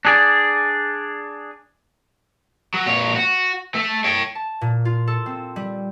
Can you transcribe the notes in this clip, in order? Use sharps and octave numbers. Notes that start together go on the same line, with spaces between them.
D4 G#4 D5
F#3
A#2 C#5
F#4
A3
C#5 G5
A5
A#2
F4
A4
C4
G3